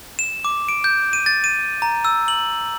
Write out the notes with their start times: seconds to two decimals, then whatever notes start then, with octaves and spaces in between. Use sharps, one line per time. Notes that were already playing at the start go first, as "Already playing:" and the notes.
0.19 E7
0.45 D6
0.69 D7
0.84 G6
1.13 D#7
1.26 A6
1.44 D#7
1.82 A#5
2.05 E6
2.28 F#7